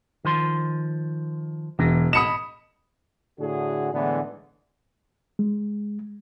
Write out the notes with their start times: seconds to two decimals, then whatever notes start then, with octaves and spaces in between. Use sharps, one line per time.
0.25 D#3 F3 C6
1.79 E1 E3
2.13 D#5 B5 D#6 C#7 E7
3.40 A2 D3 F#4 G#4
3.93 A2 D3 E3 G#3 B3
5.39 G#3